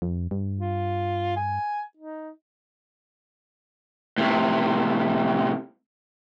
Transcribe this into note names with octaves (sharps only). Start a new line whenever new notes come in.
F2
G2
F4
G#5
D#4
A2 C3